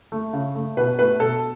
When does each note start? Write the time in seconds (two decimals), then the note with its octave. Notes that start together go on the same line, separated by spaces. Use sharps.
0.12 A3
0.33 C#3
0.55 A3
0.77 B2 B4
0.99 A3 B4
1.20 B2 A4